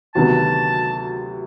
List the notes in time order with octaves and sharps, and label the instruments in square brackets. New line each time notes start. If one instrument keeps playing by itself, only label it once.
[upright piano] D2 C3 D#3 F#3 B3 [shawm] A5